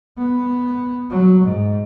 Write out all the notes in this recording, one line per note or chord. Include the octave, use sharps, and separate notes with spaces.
B3
F#3
G#2